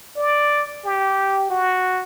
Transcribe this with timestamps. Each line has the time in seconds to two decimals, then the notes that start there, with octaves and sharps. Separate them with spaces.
0.16 D5
0.84 G4
1.50 F#4